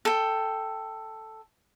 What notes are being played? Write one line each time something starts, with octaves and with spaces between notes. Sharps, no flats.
A4 G5